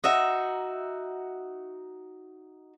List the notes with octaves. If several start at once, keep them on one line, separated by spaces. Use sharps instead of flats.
D#4 F#4 E5